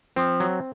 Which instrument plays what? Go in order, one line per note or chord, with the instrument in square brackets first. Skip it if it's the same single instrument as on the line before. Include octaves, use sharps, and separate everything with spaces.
[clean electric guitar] F3 [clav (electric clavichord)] C4
[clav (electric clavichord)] F#3